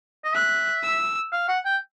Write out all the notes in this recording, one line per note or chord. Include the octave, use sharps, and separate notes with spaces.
D#5
E5 F#6
E6
F5
F#5
G5